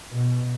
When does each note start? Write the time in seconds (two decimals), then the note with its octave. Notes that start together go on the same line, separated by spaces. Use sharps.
0.13 B2